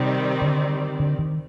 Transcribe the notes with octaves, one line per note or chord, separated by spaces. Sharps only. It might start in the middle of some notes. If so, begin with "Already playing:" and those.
Already playing: C3 D#3 G3 C4 G4 D5
D3
D3
D#3